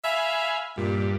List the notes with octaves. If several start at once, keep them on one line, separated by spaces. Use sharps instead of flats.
E5 F5 G#5 B5
G2 A#2